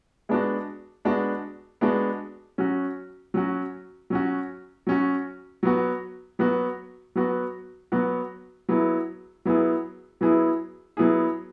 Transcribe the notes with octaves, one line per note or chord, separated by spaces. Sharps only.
G#3 B3 D4 F#4
G#3 B3 D4 F#4
G#3 B3 D4 F#4
F#3 C#4 F#4
F#3 C#4 F#4
F#3 C#4 F#4
F#3 C#4 F#4
F#3 B3 F#4
F#3 B3 F#4
F#3 B3 F#4
F#3 B3 F#4
F#3 B3 E4 G#4
F#3 B3 E4 G#4
F#3 B3 E4 G#4
F#3 B3 E4 G#4